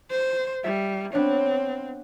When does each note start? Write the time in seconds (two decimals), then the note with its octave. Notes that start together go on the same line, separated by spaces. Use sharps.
0.10 C5
0.64 G3 E5
1.13 B3 C4 D4 C#5